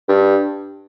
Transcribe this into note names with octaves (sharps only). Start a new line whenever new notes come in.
G2